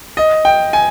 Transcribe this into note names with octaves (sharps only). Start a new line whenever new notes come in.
D#5
G5
G#5